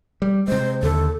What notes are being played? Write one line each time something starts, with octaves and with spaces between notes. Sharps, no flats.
G3
C3 G#3 C5
D#2 D3 A4